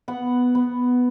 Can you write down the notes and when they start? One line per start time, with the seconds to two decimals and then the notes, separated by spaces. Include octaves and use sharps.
0.08 B3 F#5
0.55 B3